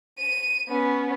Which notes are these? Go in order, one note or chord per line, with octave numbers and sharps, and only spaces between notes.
D#7
B3 C#4